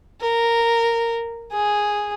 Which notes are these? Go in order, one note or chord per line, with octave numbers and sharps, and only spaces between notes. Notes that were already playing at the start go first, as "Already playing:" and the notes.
A#4
G#4